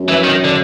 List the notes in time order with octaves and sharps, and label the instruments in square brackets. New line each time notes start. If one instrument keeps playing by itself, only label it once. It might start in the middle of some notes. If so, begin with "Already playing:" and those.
Already playing: [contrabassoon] F#2
[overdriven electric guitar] E3
D#3
D3